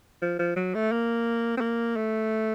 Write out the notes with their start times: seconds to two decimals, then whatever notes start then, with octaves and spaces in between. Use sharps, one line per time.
0.22 F3
0.39 F3
0.56 F#3
0.75 A3
0.92 A#3
1.57 C4
1.61 A#3
1.96 A3